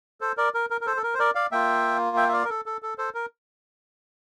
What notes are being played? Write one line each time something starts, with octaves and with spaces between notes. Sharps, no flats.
A4 C5
A#4 D5
A#4
A#4
A#4
A4 C5
A4
A#4
C5
A#4 D5
D5 F5
A#3 F4 E5 G5
E5 G5
E5
D5 F5
A#4
A4
A4
A4
A4 C5
A#4